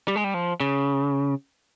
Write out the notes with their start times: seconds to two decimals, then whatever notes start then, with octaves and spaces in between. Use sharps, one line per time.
0.08 G3
0.16 G#3
0.24 G3
0.34 F3
0.60 C#3